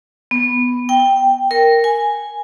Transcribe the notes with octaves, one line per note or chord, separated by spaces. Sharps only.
B3
G5
A#4
G#5